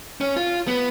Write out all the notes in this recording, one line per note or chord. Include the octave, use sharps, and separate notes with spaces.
C#4
F4
B3